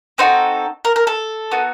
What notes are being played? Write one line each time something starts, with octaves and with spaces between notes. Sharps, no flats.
C4 D#4 F#4 A4 C5
A#4
A#4
A4
B3 D#4 F#4